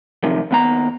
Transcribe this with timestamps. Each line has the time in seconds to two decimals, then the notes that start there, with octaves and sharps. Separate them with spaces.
0.23 F#2 C3 D#3 F3
0.51 D#2 B3 A#5